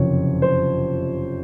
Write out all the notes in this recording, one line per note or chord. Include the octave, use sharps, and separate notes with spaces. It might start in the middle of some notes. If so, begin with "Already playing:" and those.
Already playing: F#1 F2 C3 C#5
C5